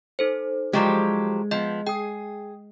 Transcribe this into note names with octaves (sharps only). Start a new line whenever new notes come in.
D#4 A4 C5
F3 F#3 G#3 G4 D5
F3 B3 D#5
G#4 G5 D#6